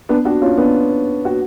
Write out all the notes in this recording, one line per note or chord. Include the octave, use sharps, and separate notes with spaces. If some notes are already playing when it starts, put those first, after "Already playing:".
B3 D4
D4 F#4
C#4 F4
B3 D4
F#4